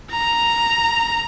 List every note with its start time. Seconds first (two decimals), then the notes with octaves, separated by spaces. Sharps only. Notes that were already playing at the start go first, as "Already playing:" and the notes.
0.11 A#5